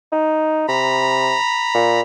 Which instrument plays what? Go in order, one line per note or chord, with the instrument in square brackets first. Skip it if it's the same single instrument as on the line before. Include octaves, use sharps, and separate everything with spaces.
[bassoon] D#4
[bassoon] C3 [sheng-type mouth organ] A#5 B5
[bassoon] A#2